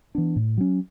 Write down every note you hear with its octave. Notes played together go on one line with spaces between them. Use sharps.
E3 B3 D4
A2
F#3 C#4